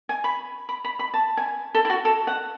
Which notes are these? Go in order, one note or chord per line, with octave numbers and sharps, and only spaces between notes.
G#5
B5
B5
B5
B5
A5
G#5
A4
E4
F#4
A4
F#5